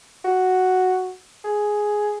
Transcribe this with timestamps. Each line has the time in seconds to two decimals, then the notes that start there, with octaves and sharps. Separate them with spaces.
0.24 F#4
1.44 G#4